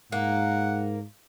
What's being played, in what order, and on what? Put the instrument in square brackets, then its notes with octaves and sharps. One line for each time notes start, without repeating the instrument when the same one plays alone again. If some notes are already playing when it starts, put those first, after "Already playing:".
[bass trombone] G#2 [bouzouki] A#3 [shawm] F#5